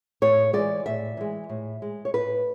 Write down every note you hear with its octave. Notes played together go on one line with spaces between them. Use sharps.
A2 C#5
E3 G#3 D5
A2 E5
E3 G#3
A2
G#3
C#5
A2 B4